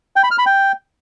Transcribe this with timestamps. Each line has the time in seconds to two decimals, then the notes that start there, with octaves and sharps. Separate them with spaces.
0.16 G5
0.24 B5
0.31 F6
0.38 B5
0.46 G5